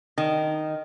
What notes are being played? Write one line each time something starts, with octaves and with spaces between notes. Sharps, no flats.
D#3